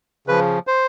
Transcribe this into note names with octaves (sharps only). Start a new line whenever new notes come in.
C#3 F3 B4
C5